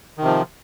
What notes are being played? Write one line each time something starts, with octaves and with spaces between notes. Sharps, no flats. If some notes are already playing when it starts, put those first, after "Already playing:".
C3 D#3 F3